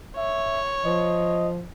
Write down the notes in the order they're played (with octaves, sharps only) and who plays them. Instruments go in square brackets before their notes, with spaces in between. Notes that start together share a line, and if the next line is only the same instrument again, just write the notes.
[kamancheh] C#5 [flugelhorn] E5
[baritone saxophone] F3 [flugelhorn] D#5